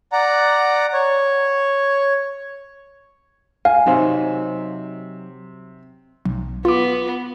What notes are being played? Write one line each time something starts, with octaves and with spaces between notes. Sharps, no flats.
D5 F#5 A#5
C#5
F5 G#5
C3 F#3 D#4 C5
B1
B3 F4 D6